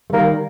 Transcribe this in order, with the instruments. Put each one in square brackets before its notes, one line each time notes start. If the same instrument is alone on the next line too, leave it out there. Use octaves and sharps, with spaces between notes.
[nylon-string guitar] A3
[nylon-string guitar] D#3 G3 [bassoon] A#3